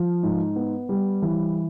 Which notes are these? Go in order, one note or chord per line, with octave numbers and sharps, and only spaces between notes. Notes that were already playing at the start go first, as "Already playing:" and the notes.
Already playing: F3
G#2
B3
G3
E3